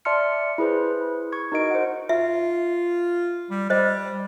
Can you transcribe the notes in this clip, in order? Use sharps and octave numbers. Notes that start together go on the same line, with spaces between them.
D5 E5 A5 C6 F6 C#7
E4 G#4 B4 C5
C#6 G#6
D#4 F#4 A#4 D#5 D7
C5 F#5
F4 E5
G3
G3 C5 D#5